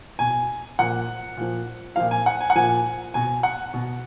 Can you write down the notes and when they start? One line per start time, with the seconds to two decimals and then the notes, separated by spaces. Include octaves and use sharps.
0.19 B2 G#5
0.79 A#2 F3 F#5
1.37 A#2 F3
1.96 A#2 F3 F5
2.11 G#5
2.26 F#5
2.41 G#5
2.50 F#5
2.56 A#2 F3 G#5
3.14 B2 G#5
3.43 F#5
3.74 B2